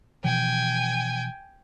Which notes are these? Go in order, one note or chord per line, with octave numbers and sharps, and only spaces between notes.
B2 E3 F3 G5 G#5